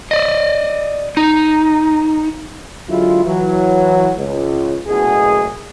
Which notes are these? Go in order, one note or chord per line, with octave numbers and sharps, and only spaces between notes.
D5 D#5
D#4
D3 F#3 G#3 E4 F4
E3 F#3
C#2
F#1 B2 A3 G#4